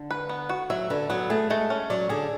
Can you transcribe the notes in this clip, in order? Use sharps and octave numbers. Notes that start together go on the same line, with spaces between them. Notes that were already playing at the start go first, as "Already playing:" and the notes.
Already playing: D3
B4
B3
F#4
F#3 E5
D3 B4
F#3 B3
A3 G#4
G#3 A3
C#4
F#3 D5
D3 G#4